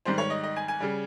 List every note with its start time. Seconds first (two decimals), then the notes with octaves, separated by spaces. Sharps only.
0.05 G#2 D#3 G3 C5
0.18 C#5
0.30 D#5
0.43 D#5
0.56 G#5
0.68 G#5
0.80 C#3 G3